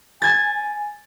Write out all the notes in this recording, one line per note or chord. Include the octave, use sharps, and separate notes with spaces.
G#5 G#6 A6